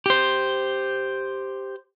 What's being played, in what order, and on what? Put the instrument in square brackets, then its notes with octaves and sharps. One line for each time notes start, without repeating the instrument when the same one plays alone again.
[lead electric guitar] G4 C5